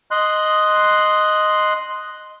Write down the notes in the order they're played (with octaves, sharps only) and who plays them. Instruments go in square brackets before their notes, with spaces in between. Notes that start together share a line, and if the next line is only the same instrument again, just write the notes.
[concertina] D#5 C6 F#6